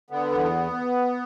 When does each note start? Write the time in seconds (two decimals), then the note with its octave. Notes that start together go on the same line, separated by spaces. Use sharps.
0.10 D3 B3
0.31 E2